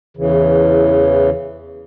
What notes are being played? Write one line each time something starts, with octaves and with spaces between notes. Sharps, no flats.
E2 C#3 E3